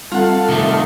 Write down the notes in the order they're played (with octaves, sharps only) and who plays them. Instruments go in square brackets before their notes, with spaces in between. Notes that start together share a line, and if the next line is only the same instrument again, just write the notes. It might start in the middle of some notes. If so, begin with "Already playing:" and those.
[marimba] G3 C4 [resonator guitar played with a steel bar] F4 F#5 [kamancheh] A4 F5
[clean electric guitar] C3 D#3 A3